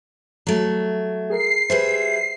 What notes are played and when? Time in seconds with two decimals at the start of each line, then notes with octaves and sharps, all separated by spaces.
0.47 F#3 G3 A3
1.30 G#4 A#4 C7
1.70 G3 G#4 B4 C5 E5